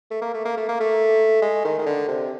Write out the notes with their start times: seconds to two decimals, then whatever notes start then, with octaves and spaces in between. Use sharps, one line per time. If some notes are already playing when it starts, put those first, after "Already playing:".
0.11 A3
0.22 A#3
0.34 A3
0.45 A#3
0.57 A3
0.68 A#3
0.80 A3
1.42 G#3
1.65 D#3
1.78 D#3
1.86 D3
2.08 C3